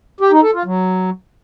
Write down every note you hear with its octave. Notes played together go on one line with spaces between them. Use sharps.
G4
D#4
A4
F4
F#3